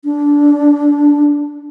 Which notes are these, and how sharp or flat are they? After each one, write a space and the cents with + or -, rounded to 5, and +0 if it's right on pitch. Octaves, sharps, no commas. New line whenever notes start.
D4 -15